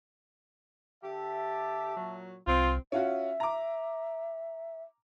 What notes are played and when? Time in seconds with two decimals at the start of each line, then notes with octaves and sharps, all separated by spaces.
1.03 D3 G4 E5 A5
1.96 A#2 F#3
2.47 C2 C4 F4
2.92 C#4 F4 F#4 E5
3.40 A#5 D6